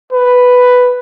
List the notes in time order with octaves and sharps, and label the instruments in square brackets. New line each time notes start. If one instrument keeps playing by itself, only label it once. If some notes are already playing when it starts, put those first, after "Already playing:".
[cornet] B4